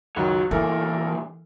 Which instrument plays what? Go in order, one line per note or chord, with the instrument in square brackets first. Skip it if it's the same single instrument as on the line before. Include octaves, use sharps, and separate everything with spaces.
[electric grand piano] C#2 F#2 D#3 [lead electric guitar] F#3 [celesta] F4 A#5
[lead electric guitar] C2 A#2 [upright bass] E3 [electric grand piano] A4 A#4 [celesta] E5 G#5